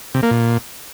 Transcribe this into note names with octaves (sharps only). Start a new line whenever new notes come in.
C3
A#3
A#2